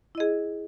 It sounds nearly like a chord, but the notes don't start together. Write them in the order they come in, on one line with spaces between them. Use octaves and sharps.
E4 D#5 G#4